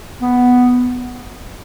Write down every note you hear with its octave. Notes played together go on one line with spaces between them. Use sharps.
B3